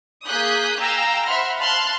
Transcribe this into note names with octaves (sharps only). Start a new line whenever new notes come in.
A#3 G#4 D#6 F#6 G6 B6
F5 G5 G#5 A#5 E6 A#6
C5 E5 F#5 B5 C6 F6
F5 A5 C6 F6 F#6